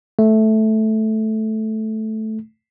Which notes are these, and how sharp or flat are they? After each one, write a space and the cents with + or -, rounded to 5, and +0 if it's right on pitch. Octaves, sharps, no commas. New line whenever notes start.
A3 -10